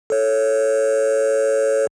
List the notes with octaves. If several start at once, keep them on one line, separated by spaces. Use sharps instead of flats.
A4 C#5